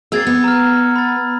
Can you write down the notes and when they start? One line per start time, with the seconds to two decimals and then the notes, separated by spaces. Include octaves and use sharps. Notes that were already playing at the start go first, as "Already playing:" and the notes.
0.12 A#3 C4 G#4 E6 G#6 A6
0.27 B3
0.44 A#5 F6
0.96 B5 A6